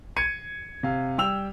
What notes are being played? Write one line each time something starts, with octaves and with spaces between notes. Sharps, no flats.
G#6 C#7 D#7
C3 F5
G3 G5 E6 F7